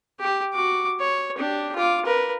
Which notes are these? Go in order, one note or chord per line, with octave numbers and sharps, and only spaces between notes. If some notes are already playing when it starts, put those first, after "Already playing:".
G4
F#4 D6
C#5
D4 G4
F4 D6
A#4 B4